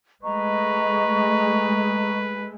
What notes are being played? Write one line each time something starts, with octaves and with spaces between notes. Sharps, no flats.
G#3 A3 B4 D#5 A#5 C#6